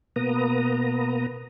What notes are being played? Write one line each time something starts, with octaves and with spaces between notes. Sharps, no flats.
B2 A#3 B3 B4 A#5 D#6